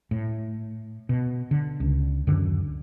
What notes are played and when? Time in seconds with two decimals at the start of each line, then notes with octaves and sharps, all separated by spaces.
0.11 A2
1.09 B2
1.51 D3
1.80 C#2
2.27 D1 F#2 D3 D#3